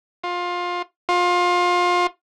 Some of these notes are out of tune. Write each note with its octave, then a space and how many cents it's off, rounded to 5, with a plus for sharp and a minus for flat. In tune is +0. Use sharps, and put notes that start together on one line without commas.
F4 +20
F4 +25